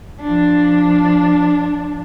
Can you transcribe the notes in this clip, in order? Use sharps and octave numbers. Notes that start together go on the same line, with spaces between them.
F3 D4